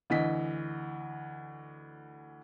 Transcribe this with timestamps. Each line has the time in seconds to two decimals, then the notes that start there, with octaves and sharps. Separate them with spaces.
0.10 D2 E3 D#5 B6